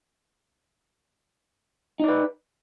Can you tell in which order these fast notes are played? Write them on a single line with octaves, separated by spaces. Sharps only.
D#4 D5 B4